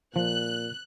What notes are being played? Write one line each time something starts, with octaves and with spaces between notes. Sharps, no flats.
A#2 F3 F#6